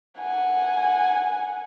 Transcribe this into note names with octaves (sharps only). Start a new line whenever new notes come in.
F#5 G#5